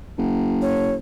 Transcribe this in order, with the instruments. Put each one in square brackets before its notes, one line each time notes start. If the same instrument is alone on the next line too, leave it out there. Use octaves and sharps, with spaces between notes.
[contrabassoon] F#1
[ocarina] C#5